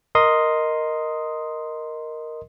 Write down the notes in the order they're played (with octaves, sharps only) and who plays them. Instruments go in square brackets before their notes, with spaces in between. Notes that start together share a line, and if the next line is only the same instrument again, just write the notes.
[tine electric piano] A#4 D#5 C6 D#6